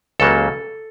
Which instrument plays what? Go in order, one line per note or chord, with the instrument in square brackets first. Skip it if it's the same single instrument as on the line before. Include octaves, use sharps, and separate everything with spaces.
[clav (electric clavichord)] C#2 C#3 F#3 A#3 A4